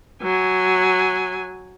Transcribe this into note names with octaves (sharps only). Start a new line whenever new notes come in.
F#3 G#5